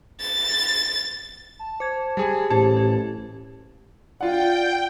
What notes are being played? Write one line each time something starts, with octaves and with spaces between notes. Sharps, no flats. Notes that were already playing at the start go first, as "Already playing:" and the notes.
A6
A5
C5 G#6
G3 G#4
A1 A2 G4 C5 A5
G4
F4 D5 F#5 G5